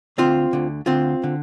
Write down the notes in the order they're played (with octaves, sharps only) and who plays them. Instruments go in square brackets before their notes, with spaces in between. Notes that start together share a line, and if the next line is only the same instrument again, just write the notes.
[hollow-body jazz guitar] D2 D3 C4 F4
D2 D3
D2 D3 C4 F4
D3